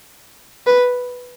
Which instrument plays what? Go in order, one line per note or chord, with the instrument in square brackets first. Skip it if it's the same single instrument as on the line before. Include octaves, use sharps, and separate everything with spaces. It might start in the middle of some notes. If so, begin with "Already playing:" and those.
[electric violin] B4